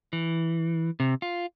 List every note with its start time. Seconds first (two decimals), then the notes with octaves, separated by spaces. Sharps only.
0.13 E3
1.00 C3
1.22 F4